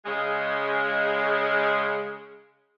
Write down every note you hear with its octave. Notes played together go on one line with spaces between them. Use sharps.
C#3 G#3